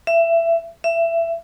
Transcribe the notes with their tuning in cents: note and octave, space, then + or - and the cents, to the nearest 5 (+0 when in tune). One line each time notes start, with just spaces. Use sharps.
E5 +20
E5 +20